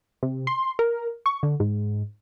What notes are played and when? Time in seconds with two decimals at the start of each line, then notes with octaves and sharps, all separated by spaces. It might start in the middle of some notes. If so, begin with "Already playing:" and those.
0.23 C3
0.47 C6
0.79 A#4
1.26 C#6
1.43 D3
1.60 G#2